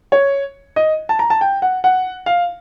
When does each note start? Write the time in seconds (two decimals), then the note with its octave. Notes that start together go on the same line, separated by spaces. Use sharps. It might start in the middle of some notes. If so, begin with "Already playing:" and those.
0.12 C#5
0.76 D#5
1.09 A5
1.19 A#5
1.30 A5
1.41 G5
1.62 F#5
1.84 F#5
2.26 F5